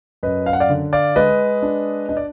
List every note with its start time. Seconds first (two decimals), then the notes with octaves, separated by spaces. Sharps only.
0.23 F#2 B4 D#5
0.46 F5
0.53 F#5
0.60 D5 F5
0.69 D3
0.93 D5 F5
1.16 G#3 B4 D#5
1.62 D4
2.09 D4 D#5
2.17 D5